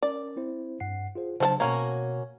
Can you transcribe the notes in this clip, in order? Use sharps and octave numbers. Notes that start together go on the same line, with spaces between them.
C#4 A#4 D5
C4 E4 C5
G2 F#5 C7
F4 G#4 C5
C#3 F3 F#3 D4 A4 A5
B2 A#3 C#4 F#4 G#5 G#6